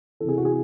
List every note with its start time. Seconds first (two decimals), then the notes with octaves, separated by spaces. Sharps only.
0.20 E3 A4
0.24 C3 G#4
0.37 F#4
0.45 G#4